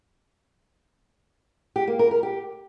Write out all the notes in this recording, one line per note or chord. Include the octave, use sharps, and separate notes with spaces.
G4
A#3
A#4
A#4
G4